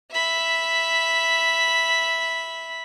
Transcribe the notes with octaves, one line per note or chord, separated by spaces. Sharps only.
E5 B5